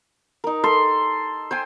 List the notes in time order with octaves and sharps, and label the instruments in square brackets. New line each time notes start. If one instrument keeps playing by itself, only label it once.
[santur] D#4 A#4
[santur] A4 [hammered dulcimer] C6
[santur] C5 G5 G#5